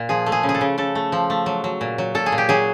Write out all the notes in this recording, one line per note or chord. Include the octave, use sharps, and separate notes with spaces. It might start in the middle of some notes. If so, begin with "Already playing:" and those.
Already playing: A#2
F3 G#4
A3
G#4
C#3
G#4
A4
C#3
C#3 A4
A3
F3
A3
F#3
F#3
A#2
F#3
A#2 A4
G#4
A#2
G4
F#3 G#4